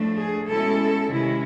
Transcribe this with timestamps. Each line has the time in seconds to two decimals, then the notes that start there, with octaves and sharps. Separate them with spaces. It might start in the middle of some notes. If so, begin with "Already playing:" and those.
Already playing: A2 F3 A3 D4
0.17 G#4
0.48 B2 G#3 C#4 E4 A4
1.08 C3 D#3 G#3 C#4 E4